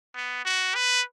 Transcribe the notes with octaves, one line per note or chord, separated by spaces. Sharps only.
B3
F#4
B4